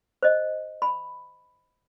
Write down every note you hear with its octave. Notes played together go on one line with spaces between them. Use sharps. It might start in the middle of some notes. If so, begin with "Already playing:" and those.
C5 D#5
B5